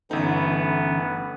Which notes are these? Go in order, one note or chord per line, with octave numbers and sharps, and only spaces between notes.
G1 D3 E3 A3 B3 C#4 D#4